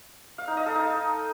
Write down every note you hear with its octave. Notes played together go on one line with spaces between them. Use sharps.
F5
D#4
D#5
A4
D#4